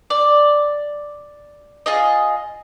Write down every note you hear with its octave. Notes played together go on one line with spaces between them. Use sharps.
D5
F4 G#4 D#5